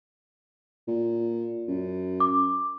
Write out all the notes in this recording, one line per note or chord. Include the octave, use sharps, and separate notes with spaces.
A#2
F#2
D6